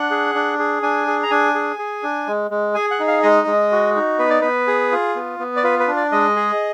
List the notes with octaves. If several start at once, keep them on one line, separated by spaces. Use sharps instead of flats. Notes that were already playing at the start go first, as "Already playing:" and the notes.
Already playing: D4 F#5
G#4
D4
G#4
D4 G#5
G#4
A#5
D4 G#5
G#4
G#4
D4
G#3
G#3
G#4 G#5
F#5
D#4
F5
G#3 D#5
G#3
F#4
D#4
B3 B4
D5
B3 B4
G#4
F4
B3
B3
D5
F4 B4
B4
D4
D5
G#3 D#5
G#4